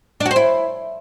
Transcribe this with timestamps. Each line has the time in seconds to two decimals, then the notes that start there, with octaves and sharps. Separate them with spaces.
0.20 D4
0.26 F#4
0.31 C5
0.36 E4